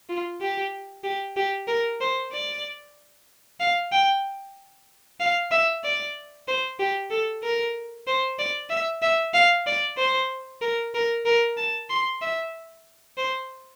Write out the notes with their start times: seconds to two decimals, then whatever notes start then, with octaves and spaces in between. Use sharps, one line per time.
0.09 F4
0.41 G4
1.04 G4
1.36 G4
1.68 A#4
2.01 C5
2.32 D5
3.60 F5
3.92 G5
5.20 F5
5.51 E5
5.84 D5
6.48 C5
6.79 G4
7.11 A4
7.43 A#4
8.07 C5
8.39 D5
8.70 E5
9.02 E5
9.34 F5
9.67 D5
9.98 C5
10.61 A#4
10.95 A#4
11.25 A#4
11.57 A5
11.90 C6
12.22 E5
13.17 C5